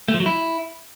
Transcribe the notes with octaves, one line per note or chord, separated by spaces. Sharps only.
A3
F3
F#3
E4